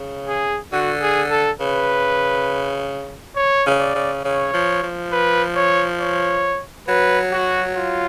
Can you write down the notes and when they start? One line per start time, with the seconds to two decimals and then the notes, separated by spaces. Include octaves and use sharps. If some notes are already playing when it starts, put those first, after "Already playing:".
Already playing: C#3
0.28 G#4
0.72 D3 F#4
1.02 G#4
1.31 A4
1.60 C#3 B4
3.36 C#5
3.66 C#3
3.80 D5
3.95 C#3
4.24 C#3 C#5
4.54 F3
4.83 F3
5.12 B4
5.56 C#5
6.01 C#5
6.88 F#3 B4
7.33 F#4
7.76 F4